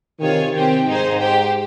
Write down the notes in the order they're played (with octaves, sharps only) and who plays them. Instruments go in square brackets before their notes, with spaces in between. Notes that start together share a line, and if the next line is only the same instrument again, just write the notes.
[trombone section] C3 D#3 [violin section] F4 G#4 C#5 G#5
[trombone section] C3 D#3 [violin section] C4 G4 C5 G5
[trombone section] G#2 [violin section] D#4 G#4 C5
[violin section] G4 C5 G5